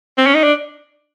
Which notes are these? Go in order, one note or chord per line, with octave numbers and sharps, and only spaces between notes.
C4
C#4
D#4
D4